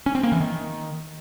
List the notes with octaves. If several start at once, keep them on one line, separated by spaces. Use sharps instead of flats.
C#4
C4
A#3
E3
D#3